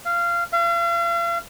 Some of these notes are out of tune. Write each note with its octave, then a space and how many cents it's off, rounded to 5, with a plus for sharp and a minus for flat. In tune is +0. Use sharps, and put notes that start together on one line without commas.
F5 -20
F5 -40